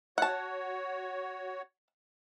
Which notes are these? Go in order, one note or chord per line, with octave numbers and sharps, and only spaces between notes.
F#4 C#5 F#5 A5